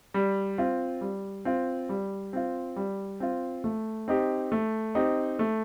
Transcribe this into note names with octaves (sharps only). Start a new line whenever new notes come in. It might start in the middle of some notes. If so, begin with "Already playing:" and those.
G3
C4 F4
G3
C4 F4
G3
C4 F4
G3
C4 F4
A3
C4 D#4 G4
A3
C4 D#4 G4
A3